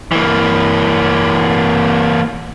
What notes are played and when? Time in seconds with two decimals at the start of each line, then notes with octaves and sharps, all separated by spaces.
0.12 E3 A#3